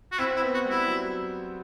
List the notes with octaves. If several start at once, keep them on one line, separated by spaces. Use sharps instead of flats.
F#4
C4 E4
E4
B3
F#4
G3
E4
F#3